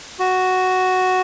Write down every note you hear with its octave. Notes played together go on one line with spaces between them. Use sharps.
F#4